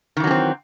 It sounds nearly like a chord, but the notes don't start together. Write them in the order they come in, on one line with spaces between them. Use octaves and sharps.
D#3 E3 F#3 C#4 C4